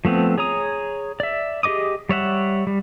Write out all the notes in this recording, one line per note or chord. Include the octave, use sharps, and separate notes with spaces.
F3 A3 B3 C4
G#4 C#5 A#5 D#6
D5 E5
G4 G#4 D#5 D6 D#6
G3 C#5 E5 F#5
G3